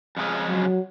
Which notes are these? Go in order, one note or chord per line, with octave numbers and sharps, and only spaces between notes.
F2 C#3 F3 G#3 C#4
F#3